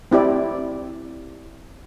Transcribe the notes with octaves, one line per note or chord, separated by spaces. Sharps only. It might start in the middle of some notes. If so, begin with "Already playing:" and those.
C4 E4 G4 D5